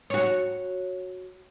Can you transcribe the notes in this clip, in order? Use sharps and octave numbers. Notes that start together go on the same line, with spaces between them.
F#4 C#5